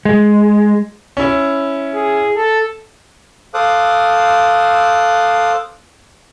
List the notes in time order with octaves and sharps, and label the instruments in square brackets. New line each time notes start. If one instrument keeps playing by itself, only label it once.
[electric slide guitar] G#3
[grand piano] C#4 E4
[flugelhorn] G#4
A4
[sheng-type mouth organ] A4 C5 F5 D6 D#6 F#6